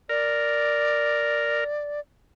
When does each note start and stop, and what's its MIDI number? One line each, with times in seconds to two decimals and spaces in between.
0.09 1.64 70
0.09 2.00 74